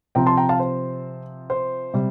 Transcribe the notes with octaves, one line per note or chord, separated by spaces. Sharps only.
C3 F3 C4 G5 A#5
A5 C6
G5 A#5
F5 A5
C5
C5
C3 G3